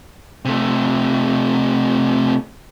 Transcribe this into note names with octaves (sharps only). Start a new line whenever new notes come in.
C3 A3